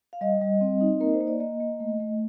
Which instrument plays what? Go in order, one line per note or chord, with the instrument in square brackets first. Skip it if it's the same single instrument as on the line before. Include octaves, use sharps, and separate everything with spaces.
[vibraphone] F5
G3 D#5
G3
C4
D#4
A#3 A#4
C5
A#3
D5
A#3 D#5
A#3
A3
A3